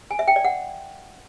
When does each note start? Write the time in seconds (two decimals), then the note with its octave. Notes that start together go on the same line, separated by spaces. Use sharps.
0.11 G#5
0.19 E5
0.28 G5
0.36 D5
0.45 F#5